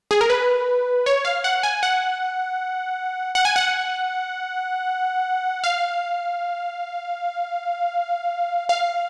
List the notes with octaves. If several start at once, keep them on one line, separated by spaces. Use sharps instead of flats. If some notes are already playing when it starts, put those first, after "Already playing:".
G#4
A#4
B4
C#5
F5
F#5
G#5
F#5
F#5
G#5
F#5
F5
F5